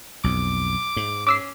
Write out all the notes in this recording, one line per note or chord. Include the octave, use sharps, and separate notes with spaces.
B1 F2 D6
G#2
C#4 D6 E6 C7